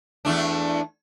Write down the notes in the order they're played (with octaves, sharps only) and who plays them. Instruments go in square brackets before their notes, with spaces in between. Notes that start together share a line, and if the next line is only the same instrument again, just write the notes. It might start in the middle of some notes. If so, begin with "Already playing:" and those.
[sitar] E2 A3 D4